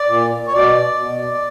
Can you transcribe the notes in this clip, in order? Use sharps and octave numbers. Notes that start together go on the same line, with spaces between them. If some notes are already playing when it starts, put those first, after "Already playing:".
Already playing: D5
A#2
C#5
B2 D5
B2